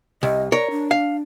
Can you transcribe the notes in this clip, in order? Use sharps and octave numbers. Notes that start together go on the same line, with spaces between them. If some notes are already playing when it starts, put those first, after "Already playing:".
C2 D#5
A#4 C#5 D5
D4
F5